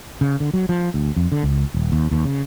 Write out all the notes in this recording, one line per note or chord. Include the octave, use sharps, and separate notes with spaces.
C#3
D3
F#3
F3
D2
F2
D3
C#2
D#1
D#2
D#2
C#3